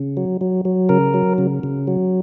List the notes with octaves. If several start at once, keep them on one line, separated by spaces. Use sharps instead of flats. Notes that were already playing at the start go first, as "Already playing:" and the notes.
Already playing: C#3
F#3
F#3
F#3
C#3 A#4
F#3
C#3
C#3
F#3